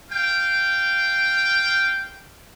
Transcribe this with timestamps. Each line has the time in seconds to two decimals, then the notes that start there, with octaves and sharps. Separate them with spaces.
0.11 F5 G5